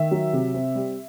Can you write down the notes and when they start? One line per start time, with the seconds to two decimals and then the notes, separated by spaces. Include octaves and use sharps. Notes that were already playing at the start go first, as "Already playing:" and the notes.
Already playing: D#3 E5
0.11 F#3
0.33 C3
0.54 C4
0.75 G3